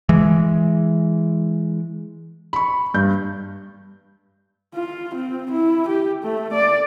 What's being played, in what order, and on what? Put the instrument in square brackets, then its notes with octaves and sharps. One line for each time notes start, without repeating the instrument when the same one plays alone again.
[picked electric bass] E3 G#3
[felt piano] B5 C#6
G2 G6
[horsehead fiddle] F4
C4
E4
G4
A3
D5